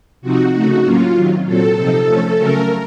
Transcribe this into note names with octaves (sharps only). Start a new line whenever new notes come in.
C3 F3 C4 D#4 F#4
C#3 A3 D#4 F#4
A2 F#3 A#3 C#4 F4
C3 D#3 F#3
A#2 F#3 C4 A4
C3 F3 C4 D#4
F3 A3 C#4
C#3 F#3 A3 C#4 A#4